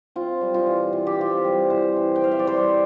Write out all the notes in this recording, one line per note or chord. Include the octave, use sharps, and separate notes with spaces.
C4 F4
G3
F4
E3
E3 F4
G4
C4 F4
G3
E3 C5
E3
G5
C4 F5
E5
D5
G3 C5